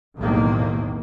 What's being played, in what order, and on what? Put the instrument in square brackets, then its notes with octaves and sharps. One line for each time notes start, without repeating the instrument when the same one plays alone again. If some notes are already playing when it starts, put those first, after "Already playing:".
[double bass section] B1 E2 A2 C3 D#3 A#3